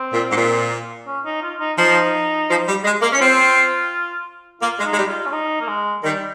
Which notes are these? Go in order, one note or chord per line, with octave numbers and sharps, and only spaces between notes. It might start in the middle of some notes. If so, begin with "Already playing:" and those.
Already playing: C4
A#2
G#2
A#2
C#4
D#4
F4
D#4
F3 D#4
F3
G3
G#3
A#3
C#4
C4 F4
A#3 F4
G#3
D#4
G#3
G3
F4
C#4
D#4
A#3
G#3
D#3 G3